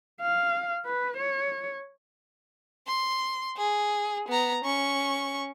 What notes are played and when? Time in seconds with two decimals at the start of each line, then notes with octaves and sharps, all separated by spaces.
0.21 F5
0.85 B4
1.17 C#5
2.88 C6
3.58 G#4
4.28 B3 A#5
4.64 C#4 C#6